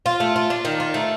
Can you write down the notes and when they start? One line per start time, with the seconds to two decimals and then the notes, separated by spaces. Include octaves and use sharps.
0.06 F4
0.20 A3
0.36 F4
0.50 D4
0.65 D#3
0.80 F4
0.94 A3